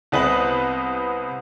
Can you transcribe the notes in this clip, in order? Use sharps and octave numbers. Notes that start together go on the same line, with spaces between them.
C2 B3 B4 C5 D#5 F#7